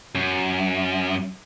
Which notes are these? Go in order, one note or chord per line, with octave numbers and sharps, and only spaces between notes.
F#2